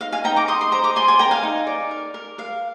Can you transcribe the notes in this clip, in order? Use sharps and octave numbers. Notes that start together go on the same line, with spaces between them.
D#4 F5
F5 G#5
D#4 G5 A#5
A#5 D6
D#5 C6 D#6
C6 D#6
C5 A#5 D6
A#5 D6
D5 G#5 C6
G#5 C6
A#4 G5 A#5
F5 G#5
D#4
D5
A#4
A#4
A#4 F5